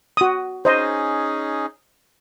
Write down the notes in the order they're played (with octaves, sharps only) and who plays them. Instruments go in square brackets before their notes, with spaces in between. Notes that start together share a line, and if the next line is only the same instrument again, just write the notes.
[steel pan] F#4 D#6
[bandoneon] C#4 D#4 G#4 [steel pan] C5 D#5